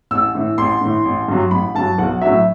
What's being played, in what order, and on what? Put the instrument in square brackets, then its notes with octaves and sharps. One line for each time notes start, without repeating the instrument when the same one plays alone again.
[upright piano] A1 E6
A2 E3
A1 C6
A2 E3
A1
G2 F#3
A1 B5
G2 F#3 A5
B1 F#5
A2 F#3 E5